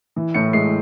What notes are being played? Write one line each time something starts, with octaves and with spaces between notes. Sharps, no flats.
E3
A2 C#7
G#3 C7